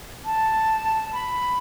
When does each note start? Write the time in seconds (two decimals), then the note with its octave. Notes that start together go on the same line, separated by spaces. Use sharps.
0.25 A5
1.13 B5